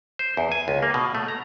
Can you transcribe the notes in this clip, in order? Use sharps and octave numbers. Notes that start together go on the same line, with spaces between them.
C5
E2
G#5
C#2
A#3
B2
A3
A#5